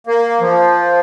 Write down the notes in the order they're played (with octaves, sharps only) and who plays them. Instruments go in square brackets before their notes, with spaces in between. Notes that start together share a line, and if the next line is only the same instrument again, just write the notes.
[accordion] A#3
F3